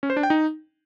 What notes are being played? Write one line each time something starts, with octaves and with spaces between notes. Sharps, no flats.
C#4
C5
D4
G5
D#4